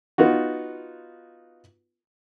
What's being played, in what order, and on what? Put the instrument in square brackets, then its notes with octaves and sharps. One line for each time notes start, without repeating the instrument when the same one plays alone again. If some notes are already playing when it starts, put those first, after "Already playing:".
[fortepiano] B3 D#4 F4 F#4